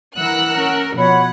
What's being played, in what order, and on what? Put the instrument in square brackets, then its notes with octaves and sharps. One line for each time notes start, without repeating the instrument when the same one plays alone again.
[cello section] E3 A#4 [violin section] F#5 E6 F#6
[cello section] C#4 A#4
[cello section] B2 F3 [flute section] C#5 B5 [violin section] F#5